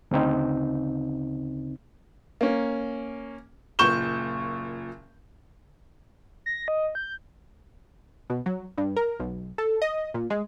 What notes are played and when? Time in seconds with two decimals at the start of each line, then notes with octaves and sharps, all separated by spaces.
0.11 D2 C#3 C4 D#4
2.41 A#3 C#4
3.79 F#1 A#2 C#6 G6 E7 G7
6.46 A#6
6.68 D#5
6.95 G6
8.30 B2
8.46 F#3
8.78 G2
8.96 A#4
9.20 B1
9.58 A4
9.82 D#5
10.14 A#2
10.30 G#3